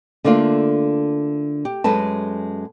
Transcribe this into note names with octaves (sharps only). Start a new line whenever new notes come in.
D3 A3 A#3 D4 F4
G4
F#2 G#3 A4 B4 A5